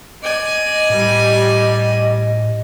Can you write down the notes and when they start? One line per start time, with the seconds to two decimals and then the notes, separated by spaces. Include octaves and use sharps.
0.23 D5 D#5 G#5
0.90 A2 G3